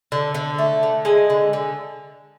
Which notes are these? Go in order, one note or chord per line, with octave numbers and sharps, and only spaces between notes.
D3
D3
A3
D3
G#3 G#5
D3
D3